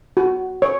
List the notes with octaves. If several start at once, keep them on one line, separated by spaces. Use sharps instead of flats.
F#4
C#5